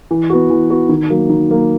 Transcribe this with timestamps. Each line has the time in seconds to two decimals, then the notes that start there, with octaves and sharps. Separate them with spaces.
0.11 E3
0.30 B3 F#4
0.50 E3
0.70 B3 F#4
0.89 D#3
1.10 F#3 A#3
1.29 D#3
1.49 F#3 A#3